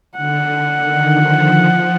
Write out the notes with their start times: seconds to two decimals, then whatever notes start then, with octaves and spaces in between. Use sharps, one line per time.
0.17 D3 F#5
0.82 D#3
1.14 F3
1.47 F3